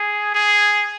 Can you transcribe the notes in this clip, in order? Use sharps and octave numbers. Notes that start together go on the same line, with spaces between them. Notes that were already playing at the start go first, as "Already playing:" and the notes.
Already playing: G#4
G#4